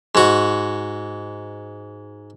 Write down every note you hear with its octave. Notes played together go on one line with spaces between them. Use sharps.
G#2 F#4